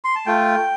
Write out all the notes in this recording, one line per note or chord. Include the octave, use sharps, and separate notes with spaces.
C6
A5
A3 F4 G5